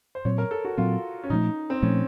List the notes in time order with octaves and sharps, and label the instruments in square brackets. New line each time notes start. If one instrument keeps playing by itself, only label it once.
[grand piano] C5
[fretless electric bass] A#2 F#3 C4 [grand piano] C#5
[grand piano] A#4
A4
F#4
[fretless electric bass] A#2 F#3 C4 [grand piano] F4
[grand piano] C#4
[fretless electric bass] A#2 F3 A3 [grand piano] D#4
[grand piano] C4
[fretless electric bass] A#2 F3 A3 [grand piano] C#4